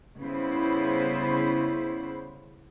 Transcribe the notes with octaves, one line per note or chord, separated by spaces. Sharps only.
C#3 G3 B3 E4 B4 C5